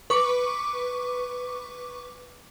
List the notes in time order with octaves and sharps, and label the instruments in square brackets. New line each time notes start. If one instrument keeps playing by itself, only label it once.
[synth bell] B4 C#6 D6